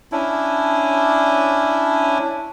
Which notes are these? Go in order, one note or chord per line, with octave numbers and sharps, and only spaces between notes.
C#4 D4 E4